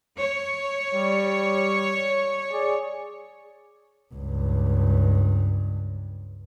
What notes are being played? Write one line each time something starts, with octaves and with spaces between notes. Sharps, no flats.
C#5
G3
G#4 D5
C#2 G2